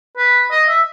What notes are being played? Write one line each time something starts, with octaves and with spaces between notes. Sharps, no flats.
B4
D#5
E5